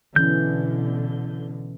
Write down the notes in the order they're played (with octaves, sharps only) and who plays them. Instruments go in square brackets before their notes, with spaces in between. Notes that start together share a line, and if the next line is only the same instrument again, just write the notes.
[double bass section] B2 D3 [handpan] E3 C#4 [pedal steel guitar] G6